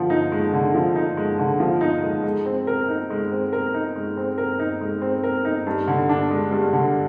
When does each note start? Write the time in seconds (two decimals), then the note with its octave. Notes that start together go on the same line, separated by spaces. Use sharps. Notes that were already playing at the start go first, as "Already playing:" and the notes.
Already playing: D3 F3
0.10 D#4
0.32 G#3
0.54 D3
0.74 F3
0.96 D#4
1.17 G#3
1.39 D3
1.60 F3
1.81 D#4
2.03 G#3
2.24 G#3
2.46 C4
2.67 A#4
2.88 D#4
3.10 G#3
3.32 C4
3.53 A#4
3.74 D#4
3.96 G#3
4.17 C4
4.38 A#4
4.59 D#4
4.81 G#3
5.02 C4
5.24 A#4
5.45 D#4
5.67 G2
5.87 D3
6.09 D4
6.31 G#3
6.51 G2
6.73 D3